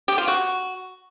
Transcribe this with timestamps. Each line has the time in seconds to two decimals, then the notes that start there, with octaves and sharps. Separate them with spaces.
0.08 G4
0.18 F4
0.28 F#4